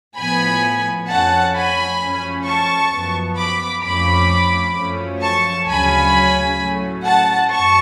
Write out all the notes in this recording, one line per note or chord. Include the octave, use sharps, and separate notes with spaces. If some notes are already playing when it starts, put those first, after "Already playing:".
A2 F3 B3 G#5 B5
F2 F3 A3 C#4 F#5 A5
G#5 B5
F#2 F3 A3 C#4
A5 C#6
F#2 F3 B3
B5 D6
F2 F3 A3 C#4 B5 D6
F#2 F3 A3 C#4
A5 C#6
D2 C#3 F#3 C#4 G#5 B5
A2 F#3 A3 C#4
F#5 A5
F#2 A5 C#6